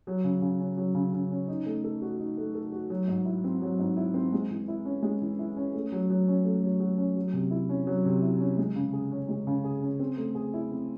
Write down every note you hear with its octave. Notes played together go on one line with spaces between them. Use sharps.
F#3
C#3
C#3
C#4
F#3
C#3
C#3
C#4
D#4
A3
A4
F#4
D#4
A3
A4
F#4
F#3
G#2
E4
C4
F#3
G#2
E4
C4
G#3
E3
E4
C#4
G#3
E3
E4
C#4
A3
F#3
F#3
C#4
A3
F#3
F#3
C#4
F#3
C3
E4
C#4
F#3
C3
E4
C#4
G#3
C#3
G#4
C#4
G#3
C#3
G#4
C#4
C4
A3
G#4
E4
C4